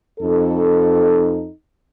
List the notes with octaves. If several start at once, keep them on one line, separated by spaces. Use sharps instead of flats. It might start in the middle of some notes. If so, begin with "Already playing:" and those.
F2 D#4 A4